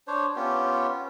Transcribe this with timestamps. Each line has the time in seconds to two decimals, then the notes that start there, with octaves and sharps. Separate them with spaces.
0.07 D4 C5 C#5
0.36 B3 C#4 F4 G4